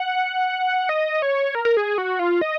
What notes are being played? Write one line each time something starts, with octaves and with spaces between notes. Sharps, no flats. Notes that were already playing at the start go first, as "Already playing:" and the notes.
Already playing: F#5
D#5
C#5
A#4
A#4
G#4
F#4
F4
D#5